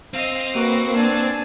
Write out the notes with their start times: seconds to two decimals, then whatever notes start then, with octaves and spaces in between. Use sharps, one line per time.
0.13 C4 D#5 F5
0.55 A#3 F#4 B4 D6
0.96 D4 G#5 A5